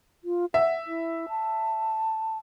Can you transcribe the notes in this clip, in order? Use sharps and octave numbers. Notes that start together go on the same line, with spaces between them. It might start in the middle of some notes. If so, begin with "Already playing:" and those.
F4
E5 F#5
E4
A5